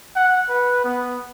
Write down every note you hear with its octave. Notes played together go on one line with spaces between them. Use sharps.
F#5
B4
B3